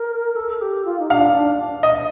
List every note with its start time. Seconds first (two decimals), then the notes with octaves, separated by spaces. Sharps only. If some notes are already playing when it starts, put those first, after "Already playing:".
Already playing: A#4
0.36 A4
0.61 G4
0.85 F4
1.00 D#4
1.10 D4 F5
1.34 D4
1.83 D#5